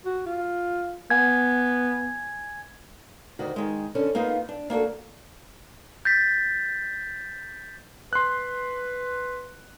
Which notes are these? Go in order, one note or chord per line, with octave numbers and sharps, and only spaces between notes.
F#4
F4
B3 G#5 G#6
D2 D#3 F#4
D#3 G#3
D3 C#4 A4
A#3 B3 D#4 F4
D4
A#3 D4 F#4 A4
G6 A6 B6
B4 C6 F#6